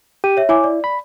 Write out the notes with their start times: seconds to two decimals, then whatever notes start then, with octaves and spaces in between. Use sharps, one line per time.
0.24 G4 D#7
0.37 C#5 E5
0.49 E4 C#5 G#5 D6
0.64 D5
0.84 B5